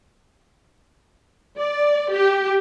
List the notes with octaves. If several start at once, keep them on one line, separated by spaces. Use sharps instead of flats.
D5
G4